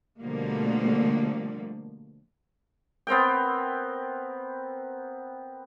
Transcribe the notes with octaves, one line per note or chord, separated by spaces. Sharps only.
B2 D3 F3 G3 A3 A#3
B3 C4 A#4 G5